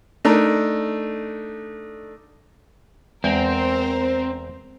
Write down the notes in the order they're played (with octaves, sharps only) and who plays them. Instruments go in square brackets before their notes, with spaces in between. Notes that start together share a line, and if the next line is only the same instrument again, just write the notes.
[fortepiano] A3 D4 D#4 A#4
[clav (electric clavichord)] E2 G5 A#5 [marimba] G#3 [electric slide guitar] C4 [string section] A#4 C5